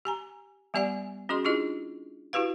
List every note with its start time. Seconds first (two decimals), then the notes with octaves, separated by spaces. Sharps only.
0.05 G4 G#5 A#5
0.74 G3 B3 G4 D5 F#5 G#5
1.29 C#4 F#4 G#4 D#5 C6
1.45 D4 E4 F4 G4 G#4 D#5
2.33 E4 F#4 G4 B4 F5